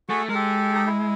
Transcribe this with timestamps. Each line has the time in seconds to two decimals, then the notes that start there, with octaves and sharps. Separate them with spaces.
0.09 A3 F#4 G#4
0.29 G#3 A#4
0.35 G4 A4
0.75 D#4
0.87 E4